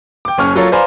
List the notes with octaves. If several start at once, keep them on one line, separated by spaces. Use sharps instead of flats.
G5 D6
F#1 C#4 C#6 F6
F#3 F4 A4 A#4 C#5
B4 C5 D5 F5 G#5 A#5